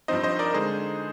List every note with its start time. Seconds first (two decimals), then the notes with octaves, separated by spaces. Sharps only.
0.08 G2 F3 C4 D#4 C5 D#5
0.23 C5 D#5
0.39 A#4 D5
0.54 D3 G#3 D#4 G#4 C5